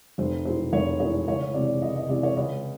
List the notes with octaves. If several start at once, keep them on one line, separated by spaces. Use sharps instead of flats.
F1 C5
E2 B2 G#3 C5
F1 C#5
E2 B2 G#3 C#5
C#2 C#5
C3 E3 G#3 D5
C#2 D#5
D#5
C3 E3 G#3 D5
C#5
C#2 D#5